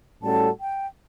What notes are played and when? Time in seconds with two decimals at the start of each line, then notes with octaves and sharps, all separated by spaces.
0.23 A2 G3 C#4 F#4 A4 A5
0.60 G5